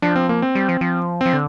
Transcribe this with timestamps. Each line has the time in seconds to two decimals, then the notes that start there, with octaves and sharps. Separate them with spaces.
0.02 F3 D4
0.16 C4
0.29 A#3
0.42 C4
0.55 G3
0.69 F3
0.81 F3
1.21 F3 C4
1.33 D3